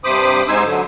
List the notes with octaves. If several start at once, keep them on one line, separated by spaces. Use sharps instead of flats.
G2 C3 C5 B5 D6 D#6
G#2 D#4 C5 G#5 E6
D3 F#3